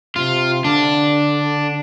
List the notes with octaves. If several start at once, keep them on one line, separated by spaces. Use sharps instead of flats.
C3 F4
D3 D4